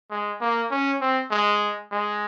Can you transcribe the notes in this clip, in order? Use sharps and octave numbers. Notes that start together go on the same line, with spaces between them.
G#3
A#3
C#4
C4
G#3
G#3